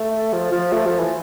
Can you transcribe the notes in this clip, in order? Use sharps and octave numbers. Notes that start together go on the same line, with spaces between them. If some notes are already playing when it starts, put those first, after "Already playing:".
Already playing: A3
F3
F3
A3
F3
E3